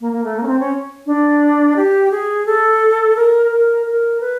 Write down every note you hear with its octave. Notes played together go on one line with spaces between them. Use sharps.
A#3
A#3
A3
A#3
C#4
C4
C#4
D4
G4
G#4
A4
A#4
A#4
A#4
B4